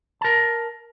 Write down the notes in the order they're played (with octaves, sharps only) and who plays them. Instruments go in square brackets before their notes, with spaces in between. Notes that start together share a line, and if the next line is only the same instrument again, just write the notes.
[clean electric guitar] A#4 A5